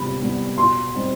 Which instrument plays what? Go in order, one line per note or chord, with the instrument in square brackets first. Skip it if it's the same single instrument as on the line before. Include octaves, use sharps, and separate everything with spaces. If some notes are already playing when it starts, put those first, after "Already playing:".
Already playing: [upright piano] C3 G3 B3 B5
G3 B3
B2 C6
G3 C4 D#4